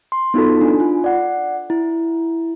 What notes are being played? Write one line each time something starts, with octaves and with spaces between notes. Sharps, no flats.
C6
B3 D#4 F4 F#4 A4
D4 G#5
F4
D5 F#5
E4